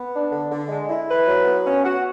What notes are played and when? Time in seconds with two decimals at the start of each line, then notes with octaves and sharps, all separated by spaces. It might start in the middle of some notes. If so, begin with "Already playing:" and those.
Already playing: B3
0.12 D4
0.31 D3
0.50 D3
0.68 G#3
0.88 E4
1.07 B4
1.26 F#3
1.45 B3
1.64 C#4
1.82 F#4